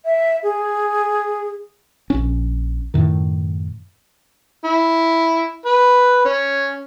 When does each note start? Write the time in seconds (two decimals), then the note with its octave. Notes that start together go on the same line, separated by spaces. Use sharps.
0.05 E5
0.43 G#4
2.10 A#1 C#4
2.94 F#2 A2 D#3
4.64 E4
5.66 B4
6.25 C#4